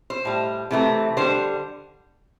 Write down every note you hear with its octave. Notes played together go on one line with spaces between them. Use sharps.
C5
A2 G3
C3 E3 A3
D3 G3 C5